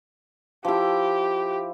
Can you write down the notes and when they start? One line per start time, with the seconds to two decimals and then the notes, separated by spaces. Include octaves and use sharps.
0.65 F3 E4 G4